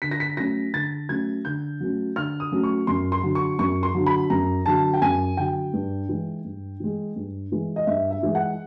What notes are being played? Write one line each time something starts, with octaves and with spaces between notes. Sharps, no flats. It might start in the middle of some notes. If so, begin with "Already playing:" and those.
D3 B6
A#6
B6
F#3 A3 C#4 A#6
D3 A6
F#3 A3 C#4 G#6
D3 G6
F#3 A3 C#4
D3 F6
D#6
F#3 A3 C#4
C#6
F#2 C6
C6
D3 F#3
C#6
F#2 C#6
C6
D3 F#3
B5
F#2 A#5
D3 F#3 A5
G5
F#2 G#5
D3 F#3 G5
G2
E3 G#3
G2
E3 G#3
G2
E3 G#3
D#5
G2 E5
E5
E3 G#3
F#5